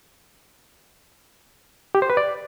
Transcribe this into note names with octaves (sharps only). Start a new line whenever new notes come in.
G4
C5
B4
D5